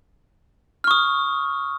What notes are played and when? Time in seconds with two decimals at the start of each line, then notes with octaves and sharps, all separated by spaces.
0.84 F6
0.87 C#6
0.91 D#6